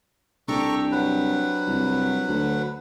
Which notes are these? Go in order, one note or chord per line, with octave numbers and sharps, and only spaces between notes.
C2 D4 G4 A4 C5 A#5 C#6
F#3 B4
C2
D2